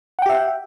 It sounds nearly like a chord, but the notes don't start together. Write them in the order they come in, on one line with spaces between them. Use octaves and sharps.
F#5 G5 G4 E5